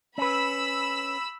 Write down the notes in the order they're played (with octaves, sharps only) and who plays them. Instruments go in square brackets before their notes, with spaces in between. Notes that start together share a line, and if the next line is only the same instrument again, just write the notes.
[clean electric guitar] C#4 B4 [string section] B5 E6